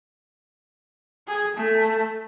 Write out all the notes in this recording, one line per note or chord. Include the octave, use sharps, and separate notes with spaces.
G#4
A3